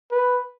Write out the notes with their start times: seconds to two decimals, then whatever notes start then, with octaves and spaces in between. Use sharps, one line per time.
0.12 B4